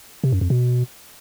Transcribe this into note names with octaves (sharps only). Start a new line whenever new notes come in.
C3
F#2
F2
B2